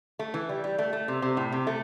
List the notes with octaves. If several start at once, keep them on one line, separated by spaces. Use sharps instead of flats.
A3
E3
G3
G3
A3
A3
C3
C3
A2
C3
A3